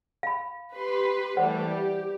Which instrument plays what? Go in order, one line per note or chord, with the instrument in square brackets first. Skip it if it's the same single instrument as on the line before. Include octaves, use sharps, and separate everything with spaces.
[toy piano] F5 B5
[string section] G4 B4 C6
[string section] E3 G3 A3 [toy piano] C5 F#5
[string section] G4